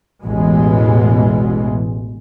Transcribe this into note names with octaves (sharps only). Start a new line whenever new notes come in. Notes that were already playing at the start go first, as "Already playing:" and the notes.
A1 E2 B2 E3 G#3